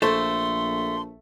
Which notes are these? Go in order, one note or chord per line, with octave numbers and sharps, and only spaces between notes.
A#1 A3 A4 C5 C6